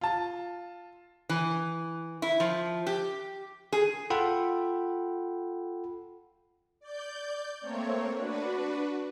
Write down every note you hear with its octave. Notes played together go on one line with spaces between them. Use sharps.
F4 A5
E3
E4
F3
G4
G#4
F4 A4 F#5 G5 B5
D5 G6
A3 A#3 C4 C#5
D4 F#4 B4